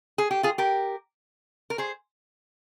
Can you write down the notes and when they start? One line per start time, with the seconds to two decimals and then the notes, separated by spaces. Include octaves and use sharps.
0.18 G#4
0.31 G4
0.43 F4 G#4
0.58 G4 A#4
1.70 A#4
1.78 G#4 C5